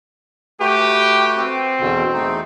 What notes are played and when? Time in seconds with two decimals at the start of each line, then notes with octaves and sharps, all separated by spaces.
0.60 A3 F#4 G4 B4
1.37 C4
1.80 E2 B2 D3
2.13 E2 A3 D#4